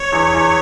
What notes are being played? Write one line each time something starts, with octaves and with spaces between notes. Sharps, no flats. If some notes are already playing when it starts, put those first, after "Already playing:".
Already playing: C#5
E2
E2